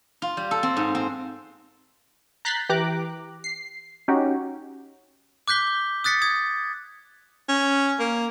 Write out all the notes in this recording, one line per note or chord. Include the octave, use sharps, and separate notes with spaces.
F4
G3
A4
C4
G#2
C4
A#5 F#6 G6 A6 B6 C7
E3 G4 A#5 D6 F#6
C7
C#4 D#4 F#4 G4
D6 F#6 G6 B6 G7
D#6 F#6 A6 B6 C#7
D#6 G#6
C#4
A#3